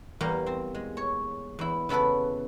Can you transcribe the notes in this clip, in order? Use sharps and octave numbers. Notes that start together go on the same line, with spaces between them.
E2 G3 A#3 G4 A#4
C4
G#3
C#5
E2 E4
C#3 B3 E4 A4 B4